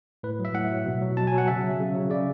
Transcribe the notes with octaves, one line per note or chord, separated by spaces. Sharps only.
A2 B4
F#3
E5
A2 F#5
F#3
B2
F#3
B2 A5
G#5
F#3
F#5
C#3 E5
F#3
C#3
F#3
C#3 D5